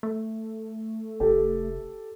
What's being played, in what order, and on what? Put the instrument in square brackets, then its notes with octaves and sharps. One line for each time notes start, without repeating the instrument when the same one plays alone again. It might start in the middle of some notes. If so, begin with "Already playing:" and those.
[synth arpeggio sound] A3
[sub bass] F1 [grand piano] G4 A4